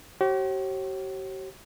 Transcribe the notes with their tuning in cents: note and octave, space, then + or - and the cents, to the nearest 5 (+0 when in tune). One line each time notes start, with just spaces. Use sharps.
G4 -45 C#5 -45